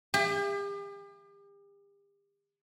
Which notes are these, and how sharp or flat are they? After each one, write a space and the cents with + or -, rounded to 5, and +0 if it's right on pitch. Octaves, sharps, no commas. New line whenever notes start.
G4 +40